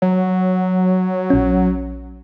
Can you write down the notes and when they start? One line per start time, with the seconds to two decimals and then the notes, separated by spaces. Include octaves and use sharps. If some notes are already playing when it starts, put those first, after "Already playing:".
0.02 F#3
1.30 A#1 C#4